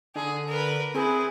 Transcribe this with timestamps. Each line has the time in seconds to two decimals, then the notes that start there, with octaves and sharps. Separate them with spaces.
0.16 D3 G#4
0.48 A#4 B4
0.94 C4 E4 G#4 B4